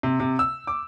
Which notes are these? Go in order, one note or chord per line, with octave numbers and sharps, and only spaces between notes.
C3
C3
E6
D6